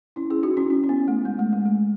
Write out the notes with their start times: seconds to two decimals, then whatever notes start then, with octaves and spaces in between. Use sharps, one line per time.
0.16 C#4 E4
0.30 E4 G#4
0.43 D#4 F#4
0.57 C#4 E4
0.70 C#4
0.84 C#4
0.89 B3
1.08 A3
1.25 G#3
1.39 A3
1.53 G#3
1.66 A3